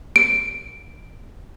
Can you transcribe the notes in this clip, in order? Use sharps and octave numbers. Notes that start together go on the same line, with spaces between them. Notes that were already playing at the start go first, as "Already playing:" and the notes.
D7